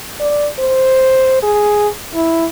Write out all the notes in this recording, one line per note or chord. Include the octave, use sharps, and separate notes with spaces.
D5
C5
G#4
E4